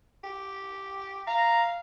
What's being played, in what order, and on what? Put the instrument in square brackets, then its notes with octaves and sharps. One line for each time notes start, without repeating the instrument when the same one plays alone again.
[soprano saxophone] G4
[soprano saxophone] F5 [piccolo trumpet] A#5